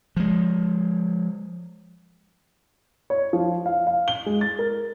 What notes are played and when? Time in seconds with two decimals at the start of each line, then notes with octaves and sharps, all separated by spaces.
0.17 F3 G#3
3.10 C#5
3.33 F3
3.66 F5
3.87 F5
4.08 G7
4.26 G#3
4.41 A6
4.59 A#4